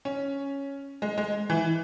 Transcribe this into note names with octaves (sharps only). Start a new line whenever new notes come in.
C#4
G#3
G#3
E3